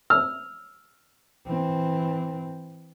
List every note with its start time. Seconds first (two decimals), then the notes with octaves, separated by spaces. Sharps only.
0.10 E6 F6
1.47 E3 C4